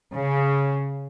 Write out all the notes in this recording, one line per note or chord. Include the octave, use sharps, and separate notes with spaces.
C#3